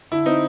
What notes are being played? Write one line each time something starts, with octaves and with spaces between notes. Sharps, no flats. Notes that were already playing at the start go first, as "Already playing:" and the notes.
D3 E4
C4 D#4